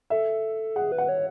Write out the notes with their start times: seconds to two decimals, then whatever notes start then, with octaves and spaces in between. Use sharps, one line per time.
0.10 A4 E5
0.76 G#4 F#5
0.92 B4
0.98 F#5
1.09 C#5